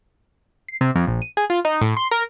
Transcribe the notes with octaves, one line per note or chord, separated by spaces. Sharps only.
C7
C3
F2
A#1
D#7
G#4
F4
D#4
A2
C6
A#4